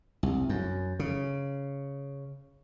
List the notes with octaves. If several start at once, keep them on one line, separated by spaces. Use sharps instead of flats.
C2
F#2
C#3